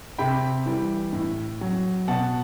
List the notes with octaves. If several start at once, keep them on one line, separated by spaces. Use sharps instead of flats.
C3 G5 B5
E3 G3
A2
F#3
B2 F#5 A5